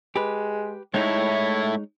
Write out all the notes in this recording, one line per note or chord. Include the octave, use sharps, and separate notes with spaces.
G#3 G4 B4
A2 G#3 D#4 E4 C#5